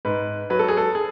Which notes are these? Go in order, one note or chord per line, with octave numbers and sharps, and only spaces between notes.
G#2 B4
F#3 B4
A4
G#4
A4
G#4